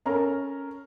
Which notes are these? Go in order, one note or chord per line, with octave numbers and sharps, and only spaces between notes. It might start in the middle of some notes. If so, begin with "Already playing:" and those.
C#4 A4 A#4 A#5